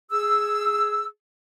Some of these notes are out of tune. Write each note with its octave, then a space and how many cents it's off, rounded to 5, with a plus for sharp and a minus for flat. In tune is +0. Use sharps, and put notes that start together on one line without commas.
G#4 +0 E6 +0